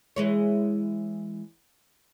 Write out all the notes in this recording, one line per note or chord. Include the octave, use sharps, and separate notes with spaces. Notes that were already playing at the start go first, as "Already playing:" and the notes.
E3 G#3 C#5